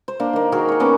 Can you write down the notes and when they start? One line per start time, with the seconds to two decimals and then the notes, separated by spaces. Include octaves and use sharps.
0.08 C5
0.20 A#3 D4
0.33 D#3 A#3
0.52 D#3 F#4 G#4 A#4
0.69 D#5 C#6
0.80 A#3 B3 C#4 D6